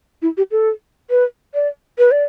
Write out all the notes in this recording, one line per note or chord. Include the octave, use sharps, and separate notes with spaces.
E4
G4
A4
B4
D5
B4
D5